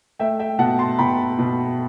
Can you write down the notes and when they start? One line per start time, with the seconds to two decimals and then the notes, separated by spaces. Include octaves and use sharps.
0.19 A3 E5 G5
0.39 E5 G5
0.59 B2 F#5 A5
0.79 A5 C6
0.99 B2 G5 B5
1.38 B2